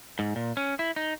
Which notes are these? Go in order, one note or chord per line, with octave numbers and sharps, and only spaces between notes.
G#2
A#2
C#4
E4
D#4